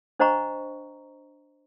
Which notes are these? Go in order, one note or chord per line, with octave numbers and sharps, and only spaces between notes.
D4 C5 D#5 F#5 A#5 C#6